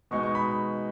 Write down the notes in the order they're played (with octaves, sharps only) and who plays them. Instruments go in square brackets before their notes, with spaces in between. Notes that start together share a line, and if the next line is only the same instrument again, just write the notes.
[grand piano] B2 G#3 D#4 C#6
C#6
B5